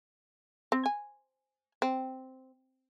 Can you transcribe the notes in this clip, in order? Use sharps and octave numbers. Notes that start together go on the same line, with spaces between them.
C4
G#5
C4